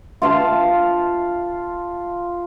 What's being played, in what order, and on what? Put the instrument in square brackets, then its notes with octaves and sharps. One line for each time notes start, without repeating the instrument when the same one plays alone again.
[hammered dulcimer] F4 F5 A5